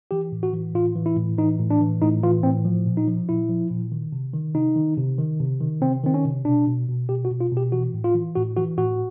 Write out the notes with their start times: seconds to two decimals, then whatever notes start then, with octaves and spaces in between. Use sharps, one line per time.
0.11 E3 G4
0.32 A2
0.43 F#4
0.53 E3
0.74 A2 F4
0.96 E3
1.06 E4
1.17 A2
1.38 E3 D#4
1.60 A2
1.70 D4
1.81 E3
2.02 A2 D#4
2.23 E3 F4
2.43 A2 C4
2.65 F3
2.86 A#2
2.97 D#4
3.07 F3
3.29 A#2 E4
3.49 F3
3.71 A#2
3.92 D#3
4.12 C3
4.34 D#3
4.55 C3 D#4
4.76 D#3
4.98 C3
5.18 D#3
5.40 C3
5.60 D#3
5.82 C3 C4
6.04 D#3 C4
6.14 C#4
6.25 C3
6.45 B2 D4
6.67 B2
6.89 B2
7.09 B2 G4
7.25 F#4
7.31 B2
7.41 F4
7.52 B2
7.57 G4
7.72 E3 F#4
7.94 A2
8.04 F4
8.14 E3
8.35 A2 F#4
8.57 E3 F#4
8.78 A2 F#4